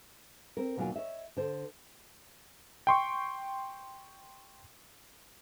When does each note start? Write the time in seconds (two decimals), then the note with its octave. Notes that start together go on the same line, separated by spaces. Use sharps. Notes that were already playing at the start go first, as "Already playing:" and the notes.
0.57 C4 A#4
0.77 D#2 B2 F#3 A#3 F4 G#5
0.96 C#5 D#5 E5
1.37 D3 C5
2.87 G5 C6 C#6